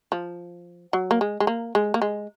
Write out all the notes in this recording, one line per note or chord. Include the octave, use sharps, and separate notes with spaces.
F3
F#3
A#3
G#3
G#3
A#3
G#3
A#3
G#3